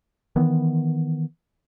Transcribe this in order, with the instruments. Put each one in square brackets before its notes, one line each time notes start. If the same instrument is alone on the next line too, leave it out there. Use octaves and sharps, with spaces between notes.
[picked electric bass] D#3 E3 B3